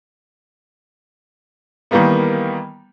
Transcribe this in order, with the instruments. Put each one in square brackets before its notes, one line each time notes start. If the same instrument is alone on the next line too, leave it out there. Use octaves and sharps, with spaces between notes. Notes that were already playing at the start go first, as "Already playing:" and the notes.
[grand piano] D#3 E3 G3 A#3 B3